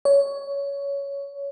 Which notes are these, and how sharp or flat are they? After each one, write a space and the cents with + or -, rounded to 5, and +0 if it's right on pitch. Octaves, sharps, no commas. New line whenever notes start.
C#5 +15